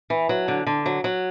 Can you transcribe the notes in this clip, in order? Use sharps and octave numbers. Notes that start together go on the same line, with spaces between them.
E3
F#3
D3
D3
F#3
F#3